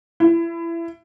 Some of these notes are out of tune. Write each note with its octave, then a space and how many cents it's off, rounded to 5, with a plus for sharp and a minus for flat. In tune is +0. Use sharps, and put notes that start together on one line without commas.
E4 +25